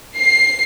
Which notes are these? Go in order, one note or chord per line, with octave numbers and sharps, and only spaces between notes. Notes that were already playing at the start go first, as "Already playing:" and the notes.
C7